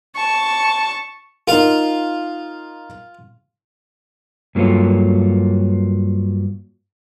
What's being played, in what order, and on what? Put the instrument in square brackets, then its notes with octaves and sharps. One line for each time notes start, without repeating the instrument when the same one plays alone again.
[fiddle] A5 C#6
[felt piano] D#4 A#4 [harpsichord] F4 F5
[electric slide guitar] G2 F#3 A#3 F4 A4 C#5